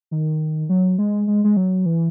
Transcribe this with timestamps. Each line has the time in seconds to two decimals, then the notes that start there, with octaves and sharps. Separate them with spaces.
0.11 D#3
0.69 F#3
0.98 G#3
1.27 G#3
1.44 G#3
1.57 F#3
1.86 E3